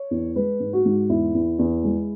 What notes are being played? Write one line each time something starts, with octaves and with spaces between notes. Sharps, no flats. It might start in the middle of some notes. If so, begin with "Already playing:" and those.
Already playing: C#5
E2
G#3 B4
G#2
F#4
G#2
E2 E4
E2
E2
G#3